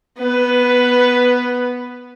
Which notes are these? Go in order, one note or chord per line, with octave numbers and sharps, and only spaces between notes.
B3 B4